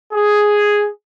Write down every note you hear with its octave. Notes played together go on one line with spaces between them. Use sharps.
G#4